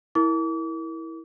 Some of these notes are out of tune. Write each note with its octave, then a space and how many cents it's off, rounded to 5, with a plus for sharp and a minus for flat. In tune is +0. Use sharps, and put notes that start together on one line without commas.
E4 -10 A#4 +0 D6 -40